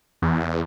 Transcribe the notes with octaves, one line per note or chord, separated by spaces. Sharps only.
E2